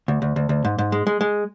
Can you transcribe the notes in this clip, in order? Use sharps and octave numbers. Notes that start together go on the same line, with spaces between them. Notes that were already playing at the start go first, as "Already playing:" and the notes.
D2
D2
D2
D2
G#2
G#2
G#3
G#3
G#3